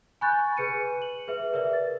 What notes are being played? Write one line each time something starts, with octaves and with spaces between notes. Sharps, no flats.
G#5 B5 C#6 F#6 G6 A6
G#4 B4 C#7 D#7
F#7
G#4 B4 E5
G#4 A#4 B4 D5 E5
A6